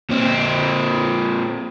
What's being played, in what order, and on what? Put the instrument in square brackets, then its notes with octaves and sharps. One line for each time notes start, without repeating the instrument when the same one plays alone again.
[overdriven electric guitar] A#2 C4